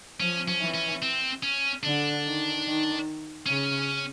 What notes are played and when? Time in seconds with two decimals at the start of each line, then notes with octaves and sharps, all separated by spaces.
0.20 F3 C#4
0.48 C#4
0.61 E3
0.74 C#4
1.02 C4
1.43 C#4
1.83 D3 D4
2.24 D#3
2.65 D#3
3.46 C#3 C#4